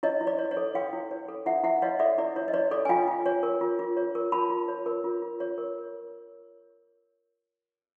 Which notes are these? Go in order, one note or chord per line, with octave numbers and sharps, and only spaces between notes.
E4 C#5 D#5
E4
D5
C#5
C#5
A4
E4 F5 G5
E4
C#5
A4
E4 E5 F#5
E4 E5 F#5
C#5 D#5 F5
A4 D5 E5
E4 D5
E4 C#5
D#5
C#5 D5
A4 D5
G#5
F4 F5 G5
F4
C#5
A#4
F4
F4
C#5
A#4
F4 A5 B5
F4
C#5
A#4
F4
F4
C#5
A#4